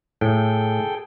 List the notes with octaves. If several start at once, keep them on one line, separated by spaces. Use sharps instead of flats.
A2 G#4 A4 G5